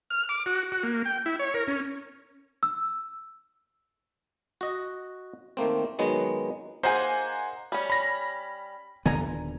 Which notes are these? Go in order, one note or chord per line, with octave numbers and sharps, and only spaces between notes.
F6
D6
F#4
F#4
A#3
G5
E4
C#5
A#4
C#4
E6
F#4 D#5
D#3 A3 A#3 C4
D#3 F#3 G#3 B3
A#3 D#4 G#4 C5 F#5 G#5
G3 C#4
B5 A#6
D#1 D3 B3 G#5 A#5